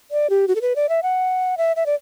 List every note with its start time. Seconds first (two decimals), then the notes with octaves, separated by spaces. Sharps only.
0.11 D5
0.30 G4
0.48 F#4
0.55 A4
0.62 B4
0.76 D5
0.89 E5
1.03 F#5
1.58 E5
1.76 E5
1.86 D5